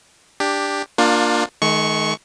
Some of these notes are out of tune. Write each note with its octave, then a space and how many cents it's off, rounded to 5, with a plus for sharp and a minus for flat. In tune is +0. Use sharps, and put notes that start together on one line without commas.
D4 +0 G4 +10
A#3 +0 D4 +20 F4 +25
D#3 +0 G#3 +45 C#6 +0